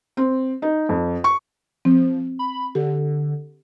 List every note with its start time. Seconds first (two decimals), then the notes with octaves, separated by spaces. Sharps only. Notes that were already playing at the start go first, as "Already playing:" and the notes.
0.17 C4
0.62 D#4
0.89 F2
1.24 C#6
1.85 F3 C4
2.39 B5
2.75 D3 G4